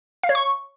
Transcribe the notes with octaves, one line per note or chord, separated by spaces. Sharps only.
F5
C#5
C#6